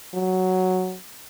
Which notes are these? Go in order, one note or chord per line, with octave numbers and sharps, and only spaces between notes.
F#3